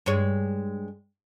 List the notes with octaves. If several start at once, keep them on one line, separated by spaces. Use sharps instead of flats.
G2 G#3 C#5